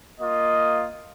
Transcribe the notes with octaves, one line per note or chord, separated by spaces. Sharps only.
A#3 F4 D#5